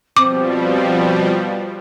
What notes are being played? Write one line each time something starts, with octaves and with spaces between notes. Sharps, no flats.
B2 F3 G3 C4 D6